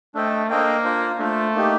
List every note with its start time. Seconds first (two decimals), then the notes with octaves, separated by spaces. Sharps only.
0.14 A3 D4 A4 C5 D#5 G5
0.49 A#3 D4 A4 C5 D#5 G5
0.84 D4 F4 C5
1.19 A3 D4 F4 C5
1.55 A#3 D#4 G4